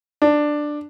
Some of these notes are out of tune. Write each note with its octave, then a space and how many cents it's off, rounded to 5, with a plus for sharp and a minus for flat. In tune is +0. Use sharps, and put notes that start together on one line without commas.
D4 +10